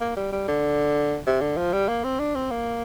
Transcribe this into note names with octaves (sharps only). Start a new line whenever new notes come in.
A#3
G3
G3
D3
C3
D3
F3
G3
A#3
C4
D4
C4
A#3